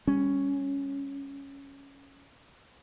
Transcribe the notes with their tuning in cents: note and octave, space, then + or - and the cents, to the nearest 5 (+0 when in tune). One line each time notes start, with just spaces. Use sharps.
G3 +30 C#4 +0